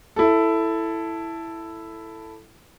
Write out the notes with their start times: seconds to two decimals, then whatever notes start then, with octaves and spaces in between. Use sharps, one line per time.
0.16 E4 A4